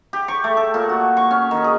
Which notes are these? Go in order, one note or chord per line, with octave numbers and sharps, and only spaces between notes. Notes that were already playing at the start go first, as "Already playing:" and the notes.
G4
C#6
A3
A4
A#2
F#4
C#6
C#4
D#3
G#4